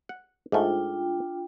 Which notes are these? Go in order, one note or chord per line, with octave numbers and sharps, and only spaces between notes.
F#5
G#2 A3 D4 F4 G5